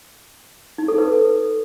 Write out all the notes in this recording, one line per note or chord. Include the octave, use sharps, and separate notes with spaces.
D#4
A4
B4